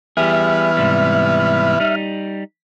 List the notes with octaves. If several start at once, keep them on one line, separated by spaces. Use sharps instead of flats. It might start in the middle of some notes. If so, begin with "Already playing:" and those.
E3 G3 B3 G4 G#4 E5 F6
G#2 C3 G3
G3 D#4